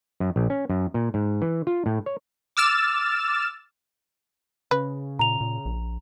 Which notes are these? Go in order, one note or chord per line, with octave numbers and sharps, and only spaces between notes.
F#2
A#1
C#4
F#2
A#2
G#2
E3
F4
A2
C#5
D6 E6 F6 A6 E7
C#3 B4
A#2 A#5 F7
A#2
A#1